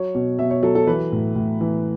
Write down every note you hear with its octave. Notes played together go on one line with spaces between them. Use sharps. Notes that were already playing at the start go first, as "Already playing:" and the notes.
Already playing: F#3 C#5
B2
B2 E5
C#5
F#3 A4
A4
E3 B4
A2
A2
E3